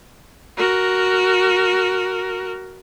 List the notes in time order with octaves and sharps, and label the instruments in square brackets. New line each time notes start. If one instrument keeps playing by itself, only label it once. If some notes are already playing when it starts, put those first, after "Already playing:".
[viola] F#4 A#4